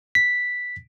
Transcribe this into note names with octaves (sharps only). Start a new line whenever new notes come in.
B6